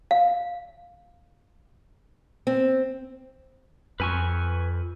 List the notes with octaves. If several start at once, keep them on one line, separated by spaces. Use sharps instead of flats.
F5
C4
F2 B4 G#5 C#6